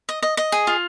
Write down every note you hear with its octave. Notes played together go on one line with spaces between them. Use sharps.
D#5
D#5
D#5
G#4
F4